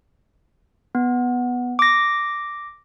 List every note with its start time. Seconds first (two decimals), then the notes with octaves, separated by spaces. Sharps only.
0.95 B3
1.79 D6 A#6